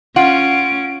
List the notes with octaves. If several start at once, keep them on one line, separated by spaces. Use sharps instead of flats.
C#4 F4 F#5 D7